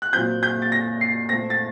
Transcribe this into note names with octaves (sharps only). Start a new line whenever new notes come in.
F#6
A#2 F#3 C4 G6
G6
A6
A#6
C7
A#2 A3 C4 A#6
A6